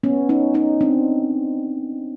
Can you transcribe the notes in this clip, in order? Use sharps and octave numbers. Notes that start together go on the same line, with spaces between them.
B3 C#4
C#4 D#4
C#4 D#4
C4 D4